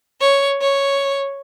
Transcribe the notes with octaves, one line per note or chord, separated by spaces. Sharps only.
C#5
C#5